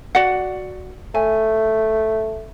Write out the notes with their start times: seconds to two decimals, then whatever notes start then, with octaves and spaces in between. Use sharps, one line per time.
0.15 F#4 D5 F#5
1.15 A3 G#5